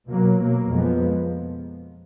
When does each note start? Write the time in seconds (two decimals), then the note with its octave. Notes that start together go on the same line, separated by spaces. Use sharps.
0.11 B2 F#3 A#3
0.41 B2 A#3
0.72 F2 F3 G#3 B3